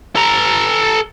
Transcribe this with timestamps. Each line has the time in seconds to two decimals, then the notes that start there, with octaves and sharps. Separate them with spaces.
0.15 A4 A#5